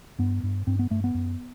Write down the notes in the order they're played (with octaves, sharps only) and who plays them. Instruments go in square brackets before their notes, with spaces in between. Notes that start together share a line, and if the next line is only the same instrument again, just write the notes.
[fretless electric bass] G2 B3
G2
G2 C4
B3
G2 A3
B3
F#2